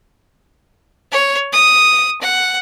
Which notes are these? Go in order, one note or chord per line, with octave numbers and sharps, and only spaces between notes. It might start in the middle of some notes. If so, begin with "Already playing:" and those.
C#5
D#6
F#5